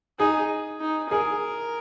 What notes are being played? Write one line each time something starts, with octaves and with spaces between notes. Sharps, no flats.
D#4 G#4
D#4
G#4 A#4